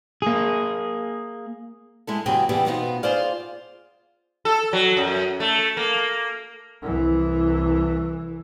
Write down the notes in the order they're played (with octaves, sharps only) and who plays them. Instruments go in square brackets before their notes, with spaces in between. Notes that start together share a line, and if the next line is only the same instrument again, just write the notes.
[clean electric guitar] A#3 G#4
[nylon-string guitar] G#3 E4 A4
E2 C#3 F#3 G4 G#4 G5
C3 E3 G3 B3 G4 G#4
B2 B3 C4 D#4 F4
F4 G#4 C5 D5 F5
[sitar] A4
F#3
F#2
A3
A#3
[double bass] C2 E3